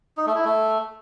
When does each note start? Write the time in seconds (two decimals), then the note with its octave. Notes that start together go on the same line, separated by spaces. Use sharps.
0.17 D#4
0.26 A3
0.35 E4
0.45 A3